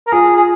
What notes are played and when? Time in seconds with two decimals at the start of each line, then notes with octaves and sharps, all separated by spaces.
0.07 A#4
0.12 F4 G#4
0.37 G#4